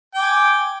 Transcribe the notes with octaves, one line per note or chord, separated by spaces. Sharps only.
G5 G#5 D6